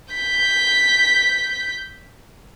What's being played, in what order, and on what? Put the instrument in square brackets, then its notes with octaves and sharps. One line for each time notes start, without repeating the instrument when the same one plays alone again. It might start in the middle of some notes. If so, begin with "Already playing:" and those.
[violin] G6 B6